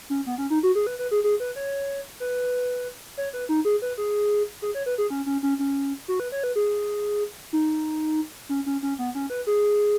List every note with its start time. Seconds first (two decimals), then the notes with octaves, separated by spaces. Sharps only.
0.10 C#4
0.26 B3
0.38 C#4
0.50 D#4
0.63 F#4
0.75 G#4
0.87 B4
0.99 B4
1.11 G#4
1.24 G#4
1.40 B4
1.56 C#5
2.20 B4
3.18 C#5
3.33 B4
3.49 D#4
3.65 G#4
3.82 B4
3.98 G#4
4.62 G#4
4.75 C#5
4.86 B4
4.98 G#4
5.10 C#4
5.26 C#4
5.43 C#4
5.59 C#4
6.08 F#4
6.20 B4
6.32 C#5
6.44 B4
6.56 G#4
7.53 D#4
8.49 C#4
8.66 C#4
8.83 C#4
8.99 B3
9.15 C#4
9.30 B4
9.47 G#4